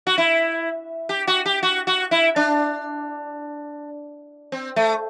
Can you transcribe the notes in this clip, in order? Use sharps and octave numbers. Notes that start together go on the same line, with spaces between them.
F#4
E4
G4
F#4
G4
F#4
F#4
E4
D4
C4
A3